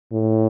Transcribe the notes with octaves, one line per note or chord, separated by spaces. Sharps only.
A2